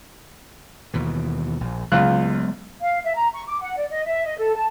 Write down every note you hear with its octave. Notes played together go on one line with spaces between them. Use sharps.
D#2 B2 E3
A#1
C#2 F#3 G#3 B3 F4 F#6
F5
E5
A#5
C#6
D6
F#5
D5
D#5
E5
D#5
A4
A5